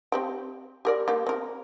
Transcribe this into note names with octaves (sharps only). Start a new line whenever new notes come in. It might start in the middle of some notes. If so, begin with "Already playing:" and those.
C4 G4 G5
G4 A#4 D5
A#3 G4
C4 A#4